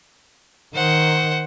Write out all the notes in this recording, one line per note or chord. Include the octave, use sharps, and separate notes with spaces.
D#3 C5 F#5